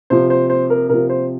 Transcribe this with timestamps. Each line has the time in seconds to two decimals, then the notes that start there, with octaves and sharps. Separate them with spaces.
0.10 C3 F3 C5
0.30 C5
0.50 C5
0.70 A#4
0.89 C3 F3 A#4
1.10 C5